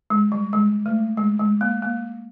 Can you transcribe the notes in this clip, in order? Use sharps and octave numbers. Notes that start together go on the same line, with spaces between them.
G#3
G3
G#3
A3
G#3
G#3
A#3
A#3